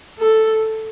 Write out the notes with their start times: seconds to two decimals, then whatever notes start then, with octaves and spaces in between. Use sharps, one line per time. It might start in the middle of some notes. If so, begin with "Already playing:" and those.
0.19 A4